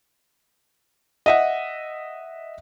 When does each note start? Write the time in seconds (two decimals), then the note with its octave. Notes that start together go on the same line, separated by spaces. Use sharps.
1.26 D#5 E5 F#5